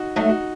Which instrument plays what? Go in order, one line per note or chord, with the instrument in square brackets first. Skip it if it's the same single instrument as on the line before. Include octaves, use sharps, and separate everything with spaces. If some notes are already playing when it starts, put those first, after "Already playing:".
Already playing: [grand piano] D#4 F#4
[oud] F#3 A3 [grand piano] D#4
[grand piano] F#4